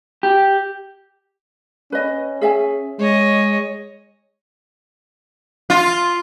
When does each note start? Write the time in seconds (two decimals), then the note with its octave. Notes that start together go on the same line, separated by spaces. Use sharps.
0.23 G4
1.92 C#4 B4 D#5
2.41 G#4 E5 G#5
2.99 G#3 C#5 D#5
5.70 F4